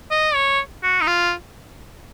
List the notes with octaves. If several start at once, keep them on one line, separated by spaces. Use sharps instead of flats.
D#5
C#5
F#4
D#4
F4